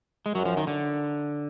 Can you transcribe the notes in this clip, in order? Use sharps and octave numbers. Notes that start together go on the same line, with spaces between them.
G#3
F#2 F#3
F3
D#3
D3